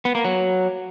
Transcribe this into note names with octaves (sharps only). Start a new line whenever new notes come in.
B3
A#3
F#3